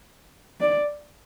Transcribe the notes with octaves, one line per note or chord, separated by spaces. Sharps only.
D5